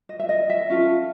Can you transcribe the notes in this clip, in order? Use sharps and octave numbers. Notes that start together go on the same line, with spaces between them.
D#5
E5
D#5
E5
C#4 F4 A4